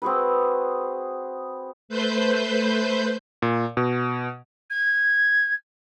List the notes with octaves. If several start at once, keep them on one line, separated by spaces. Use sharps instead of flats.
C4 F#4 G#4 B4
A3 B4 C5 G6
A#2
B2
G#6